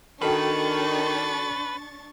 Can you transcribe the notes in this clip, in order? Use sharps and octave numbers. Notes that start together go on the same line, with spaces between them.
D#3 D4 F#4 A4 B4 G5 C#6 A6